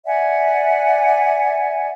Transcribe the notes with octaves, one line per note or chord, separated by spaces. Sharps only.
D5 E5 F#5 G#5